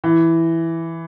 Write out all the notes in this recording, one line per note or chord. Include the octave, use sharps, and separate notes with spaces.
E3